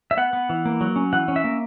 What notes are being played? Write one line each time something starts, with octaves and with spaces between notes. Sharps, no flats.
E5
B3 F#5
B3
E3
A#3
F#3
C#4
E3 F#5
C#4
E5
A#3